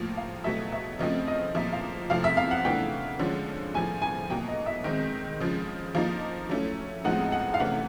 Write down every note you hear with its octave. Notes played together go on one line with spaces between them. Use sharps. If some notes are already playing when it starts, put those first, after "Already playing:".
Already playing: A2 F3 A#3
F5
B2 F#3 A3 E5
E5
C#3 F3 A3 C4 D#5
D#5
A#2 F3 A#3 E5
F5
C3 F3 A3 C4 F5
E5
F5
F#5
C#3 E3 A3 D4 G5
D3 F3 G#3 C#4
A2 F3 A3 G#5
G#5
B2 F#3 A#3 G5
D#5
E5
D#3 G#3 C4
C#3 F3 G#3
F3 A#3 D#4 F5
F#3 A3 C#4 E4
A2 F3 G#3 C4 D#4 F#5
F#5
F5
C3 E3 A3 C#4 F#5